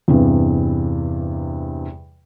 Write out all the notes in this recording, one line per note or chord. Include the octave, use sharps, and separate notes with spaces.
E2 G2 C3